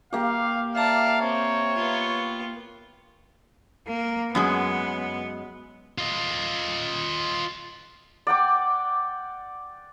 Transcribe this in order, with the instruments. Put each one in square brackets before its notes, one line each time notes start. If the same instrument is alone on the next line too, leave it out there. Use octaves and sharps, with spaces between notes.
[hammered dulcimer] A#3 G4 [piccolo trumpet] F5
[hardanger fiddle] D5 A5 [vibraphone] E5 A#5 [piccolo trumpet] F5
[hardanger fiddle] C4 [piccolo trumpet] C#5
[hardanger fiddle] B3 F4
[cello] A#3
[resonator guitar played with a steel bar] F#2 F#3 G#3 [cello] B3
[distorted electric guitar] F4 D#5
[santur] D5 F#5 G5 D6